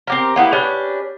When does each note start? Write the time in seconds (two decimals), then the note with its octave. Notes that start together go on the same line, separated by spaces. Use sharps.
0.07 C4 G4 A#4
0.36 A#3 B3 E4 G4
0.53 C#4 D4 G4 B4